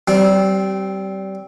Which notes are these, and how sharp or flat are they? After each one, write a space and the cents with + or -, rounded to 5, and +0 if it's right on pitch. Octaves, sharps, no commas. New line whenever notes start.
G3 -30 C4 +0